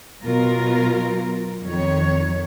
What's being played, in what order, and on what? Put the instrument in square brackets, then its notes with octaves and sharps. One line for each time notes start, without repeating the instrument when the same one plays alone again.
[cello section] B2 F#3 B3 F4 A#4
F2 D#3 C#5